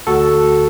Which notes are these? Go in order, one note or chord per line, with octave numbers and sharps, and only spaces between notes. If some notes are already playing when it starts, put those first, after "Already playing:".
D2 F#4 A4